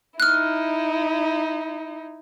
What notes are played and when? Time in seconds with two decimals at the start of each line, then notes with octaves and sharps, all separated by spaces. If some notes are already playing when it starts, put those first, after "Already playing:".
0.20 D#4 E4 F6 F#6